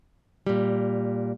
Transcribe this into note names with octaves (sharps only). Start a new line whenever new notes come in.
A#2 G3